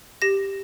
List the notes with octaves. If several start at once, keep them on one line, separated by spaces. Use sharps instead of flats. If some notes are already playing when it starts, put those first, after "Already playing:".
G4 A#6